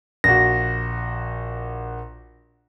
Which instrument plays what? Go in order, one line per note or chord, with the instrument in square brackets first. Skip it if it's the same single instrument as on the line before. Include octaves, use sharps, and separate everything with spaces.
[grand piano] A#1 F#4 [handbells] A#6